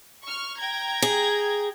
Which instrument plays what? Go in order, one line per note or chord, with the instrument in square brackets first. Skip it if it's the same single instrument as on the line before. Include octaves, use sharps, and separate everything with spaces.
[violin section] C#6 F6
G5 A#5 G#6
[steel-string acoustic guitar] G#4